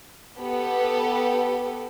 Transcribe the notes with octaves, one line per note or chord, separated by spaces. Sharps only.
B3 G4 A4 B4